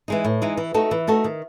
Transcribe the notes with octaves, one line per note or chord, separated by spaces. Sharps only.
E3 G#3 D#4
A2
E3 G#3 D#4
E3
A3 D#4 F#4 A4
E3
A3 D#4 F#4 A4
D#3